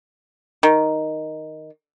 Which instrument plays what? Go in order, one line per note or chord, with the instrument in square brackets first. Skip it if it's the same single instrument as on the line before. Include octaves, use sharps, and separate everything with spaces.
[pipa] D#3